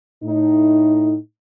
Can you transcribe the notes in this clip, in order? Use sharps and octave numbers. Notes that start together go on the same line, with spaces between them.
A2 D#4